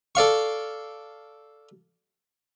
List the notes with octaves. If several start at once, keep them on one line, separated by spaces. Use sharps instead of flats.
A4 D5 F5 C#6